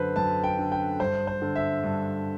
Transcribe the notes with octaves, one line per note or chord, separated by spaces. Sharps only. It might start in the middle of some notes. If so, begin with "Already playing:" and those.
Already playing: F#2 D3 B4 C5
F#2 A5
G5
D3
G5
G2 C5
C5
D3
E5
G2